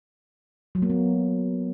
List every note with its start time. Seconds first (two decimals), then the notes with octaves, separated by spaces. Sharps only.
0.75 F#3
0.82 A#3
0.90 B3